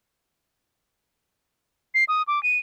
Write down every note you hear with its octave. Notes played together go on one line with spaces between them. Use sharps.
C7
D#6
D6
D#7